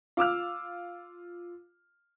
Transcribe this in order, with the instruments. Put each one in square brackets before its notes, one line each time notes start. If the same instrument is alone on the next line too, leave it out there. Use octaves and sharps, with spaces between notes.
[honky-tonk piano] F4 D6 E6 F6